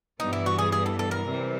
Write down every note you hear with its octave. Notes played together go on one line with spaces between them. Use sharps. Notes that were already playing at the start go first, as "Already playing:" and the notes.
G2 E3 G3 B3 D#4
E4
F#4
G#4
G#4
A4
A4
A#4
C3 E3 G3 C4